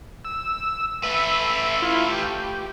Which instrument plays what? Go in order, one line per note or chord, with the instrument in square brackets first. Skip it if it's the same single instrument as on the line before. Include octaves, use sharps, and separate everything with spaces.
[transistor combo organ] E6
[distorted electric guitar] A3 B4 [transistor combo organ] E5
[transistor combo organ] E4 F4
G4